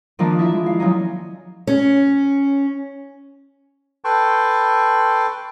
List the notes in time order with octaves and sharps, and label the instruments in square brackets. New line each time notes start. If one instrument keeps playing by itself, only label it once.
[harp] D#3 F3 A#3 D4 D#4
E4 E5
G#3
F5
F3 F#3 C#4 D#4
[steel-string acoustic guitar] C#4
[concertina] A4 B4 G5 A5 C6 C#6